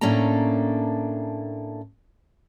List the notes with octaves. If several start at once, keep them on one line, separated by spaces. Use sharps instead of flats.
A2 A#3 C#4 D4 A4 A#5